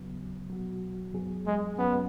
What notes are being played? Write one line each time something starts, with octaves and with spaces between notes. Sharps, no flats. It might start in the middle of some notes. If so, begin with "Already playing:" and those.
Already playing: D#2 C#3 F#3 B3
B2 F#3 B3 F#4
F#2 F#3 B3 G#4
G#3
F#2 F#3 B3 C#4